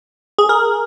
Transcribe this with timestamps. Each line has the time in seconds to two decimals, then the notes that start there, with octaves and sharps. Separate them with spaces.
0.38 G#4
0.49 A#4